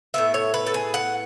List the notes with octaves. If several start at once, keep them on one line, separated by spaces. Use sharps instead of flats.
A2 E3 B3 E5
C#5
B4
A4
G#4
F#5